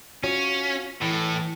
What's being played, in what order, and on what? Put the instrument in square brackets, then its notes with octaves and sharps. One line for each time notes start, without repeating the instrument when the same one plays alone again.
[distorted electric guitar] C#4 [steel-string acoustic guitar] F4 F#4 C#5
[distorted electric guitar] A2 [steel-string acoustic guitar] E3